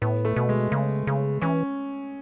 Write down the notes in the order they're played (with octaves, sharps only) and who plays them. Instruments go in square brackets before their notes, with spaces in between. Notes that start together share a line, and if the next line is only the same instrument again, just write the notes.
[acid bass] A2 [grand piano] B3
[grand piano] A3
[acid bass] B2
[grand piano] G#3
[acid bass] C#3
C#3
[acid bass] E3 [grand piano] C#4